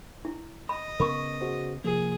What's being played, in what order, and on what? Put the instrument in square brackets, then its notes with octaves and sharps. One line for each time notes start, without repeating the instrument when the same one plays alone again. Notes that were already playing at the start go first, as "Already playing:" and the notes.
[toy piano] E4
[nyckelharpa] D#5 [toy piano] B5
[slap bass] C#3 B3 [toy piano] A#4 B5 C#6
[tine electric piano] F#4 G#4 C5
[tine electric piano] C3 F3 A#3 [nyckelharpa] G#4